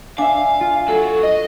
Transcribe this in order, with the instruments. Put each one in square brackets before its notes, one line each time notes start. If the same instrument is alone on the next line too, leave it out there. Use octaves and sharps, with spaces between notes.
[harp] D4 E5 [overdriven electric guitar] F5 [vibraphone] G#5
[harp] F4
[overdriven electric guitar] F#3 [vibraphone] A4
[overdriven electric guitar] D#5